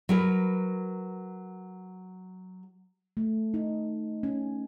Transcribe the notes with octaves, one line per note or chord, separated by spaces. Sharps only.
F#3 A#4 B4
A3
D#4
C#4